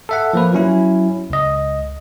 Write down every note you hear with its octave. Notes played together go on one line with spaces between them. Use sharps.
A4 E5 F#5
F3 A#3 B4
F#3 C#4 E4
C#2 D#5